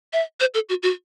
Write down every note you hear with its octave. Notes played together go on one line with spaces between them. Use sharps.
E5
C5
A4
F#4
F#4